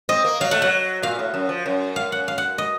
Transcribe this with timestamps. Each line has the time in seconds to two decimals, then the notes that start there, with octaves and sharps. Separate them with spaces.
0.09 C4 D#5
0.25 A#3
0.40 F#3 F5
0.51 A3 F#5
0.62 F#3 F#5
1.02 A#2 F5
1.19 A2
1.34 F#2
1.49 F3
1.66 F#2
1.96 F5
2.12 F#5
2.28 F5
2.38 F#5
2.58 D#5